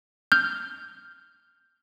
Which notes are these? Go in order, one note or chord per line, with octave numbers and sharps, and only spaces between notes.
F6 G6